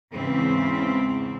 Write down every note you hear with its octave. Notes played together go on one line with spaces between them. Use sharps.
E2 G#2 C#3 E3 C4